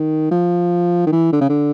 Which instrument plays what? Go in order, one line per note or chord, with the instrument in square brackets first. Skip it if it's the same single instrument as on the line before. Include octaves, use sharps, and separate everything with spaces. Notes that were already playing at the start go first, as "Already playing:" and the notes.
Already playing: [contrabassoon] D#3
F3
D#3
E3
D3
C#3
D3